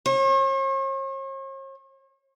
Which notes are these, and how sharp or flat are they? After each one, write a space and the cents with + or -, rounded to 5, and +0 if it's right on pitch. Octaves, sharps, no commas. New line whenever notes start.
C#5 -45